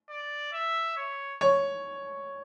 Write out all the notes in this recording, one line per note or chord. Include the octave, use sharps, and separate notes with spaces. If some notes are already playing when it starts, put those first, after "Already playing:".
D5
E5
C#5
C#5